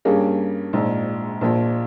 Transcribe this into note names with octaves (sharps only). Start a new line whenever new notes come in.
G2 G3 A#3 C#4 G#4
A#1 G#2 F3
A#1 A#2 F3